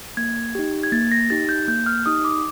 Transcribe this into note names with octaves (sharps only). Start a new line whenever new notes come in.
A#3 G#6
D#4 G4
G#6
A#3 A6
A#6
D#4 G4 A6
G6
A#3 G6
F6
D#4 G4 D#6
D6